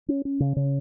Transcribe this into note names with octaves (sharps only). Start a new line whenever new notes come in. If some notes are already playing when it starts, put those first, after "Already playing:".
C#4
C#4
C#3
C#3